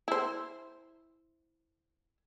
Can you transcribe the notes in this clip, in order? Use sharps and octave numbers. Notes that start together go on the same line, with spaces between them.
E4 C5